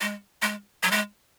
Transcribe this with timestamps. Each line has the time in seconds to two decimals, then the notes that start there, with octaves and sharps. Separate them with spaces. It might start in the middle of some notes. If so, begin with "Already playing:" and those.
0.01 G#3
0.42 G#3
0.83 F#3
0.91 G#3